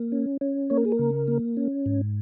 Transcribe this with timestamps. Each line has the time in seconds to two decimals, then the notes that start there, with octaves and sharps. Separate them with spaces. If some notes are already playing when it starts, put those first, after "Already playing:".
Already playing: A#3
0.12 C#4
0.41 C#4
0.70 A#3 C#5
0.77 A#4
0.85 G#4
0.92 A#4
0.99 C#3
1.28 A#3
1.57 C#4
1.86 G#2